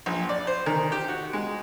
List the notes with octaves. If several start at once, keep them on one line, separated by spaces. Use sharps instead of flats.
A#1
D5
C5
D#3
G4
F#4
G#3